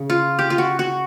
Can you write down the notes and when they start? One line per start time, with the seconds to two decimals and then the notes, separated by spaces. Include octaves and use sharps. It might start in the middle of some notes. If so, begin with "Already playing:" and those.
Already playing: C#3
0.10 F4
0.39 G4
0.50 F4
0.58 F#4
0.79 F#4